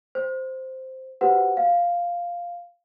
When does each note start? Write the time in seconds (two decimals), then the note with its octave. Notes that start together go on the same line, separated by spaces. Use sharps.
0.15 C5
1.21 F#4 G4 B4 C5 F#5
1.57 F5